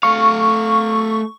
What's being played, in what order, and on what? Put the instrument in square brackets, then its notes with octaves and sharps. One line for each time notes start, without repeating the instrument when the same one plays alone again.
[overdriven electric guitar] A3 F5 [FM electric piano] C#6